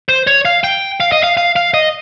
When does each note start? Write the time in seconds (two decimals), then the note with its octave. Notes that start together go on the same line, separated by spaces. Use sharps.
0.09 C5
0.27 C#5
0.45 F5
0.64 G5
1.00 F5
1.12 D#5
1.23 F5
1.37 F5
1.56 F5
1.74 D#5